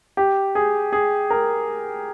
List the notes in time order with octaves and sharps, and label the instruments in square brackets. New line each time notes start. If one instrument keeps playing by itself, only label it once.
[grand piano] G4
G#4
G#4
A#4